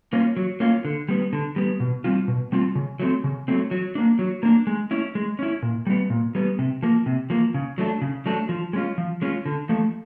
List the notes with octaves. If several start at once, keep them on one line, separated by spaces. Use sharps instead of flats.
A#3 C#4 F4
F#3
A#3 C#4 F4
D3
G3 B3
D3
G3 B3
B2
G3 C4 F4
B2
G3 C4 F4
C#3
F#3 A3 C4
C#3
F#3 A3 C4
F#3
A#3 D4
F#3
A#3 D4
G#3
C#4 E4
G#3
C#4 E4
A#2
G3 B3
A#2
G3 B3
C3
F3 A#3
C3
F3 A#3
C#3
F#3 A3 D4
C#3
F#3 A3 D4
F3
G#3 C#4 F4
F3
G#3 C#4 F4
D3
F3 A3